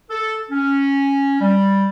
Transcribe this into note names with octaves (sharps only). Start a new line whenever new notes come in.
A4
C#4
G3